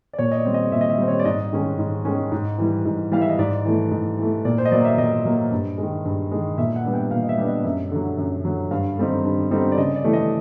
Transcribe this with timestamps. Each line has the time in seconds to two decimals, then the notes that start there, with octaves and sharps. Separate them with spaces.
0.13 D5
0.19 A#2 C#5
0.32 D#5
0.36 D5
0.45 G3 C4
0.54 D#5
0.72 A#2 E5
0.81 D#5
0.90 E5
0.98 G3 C4
1.08 C#5
1.19 D5
1.25 G#2 D#5
1.52 D#3 G#3 C#4
1.79 G#2
2.05 D#3 G#3 C#4
2.32 G#2
2.58 E3 G3
2.85 G#2
3.12 E3 G3 F5
3.21 E5
3.30 D#5
3.39 G#2 D5
3.65 E3 A3
3.91 G#2
4.19 E3 A3
4.45 A#2 D5
4.58 C5
4.65 D#5
4.72 F#3 A#3 D5
4.85 E5
4.98 A#2 D#5
5.25 F#3 A#3
5.51 G2
5.78 D#3 G#3
6.05 G2
6.31 D#3 G#3
6.58 A#2 E5
6.76 F#5
6.85 G3 B3 D4
6.93 G5
7.11 A#2 F5
7.23 D#5
7.29 E5
7.38 G3 B3 D4
7.47 D#5
7.64 F#2 E5
7.91 D3 F#3
8.18 F#2
8.45 D3 F#3
8.71 G2 F5
8.98 D3 G3 C4 D#4
9.24 G2
9.51 D3 G3 C4 D#4
9.72 D5
9.78 C#3 D#5
9.96 D5
10.04 E3 A3
10.13 D#5